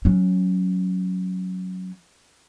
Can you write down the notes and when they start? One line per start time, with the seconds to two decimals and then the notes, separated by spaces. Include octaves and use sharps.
0.05 F#3 C#4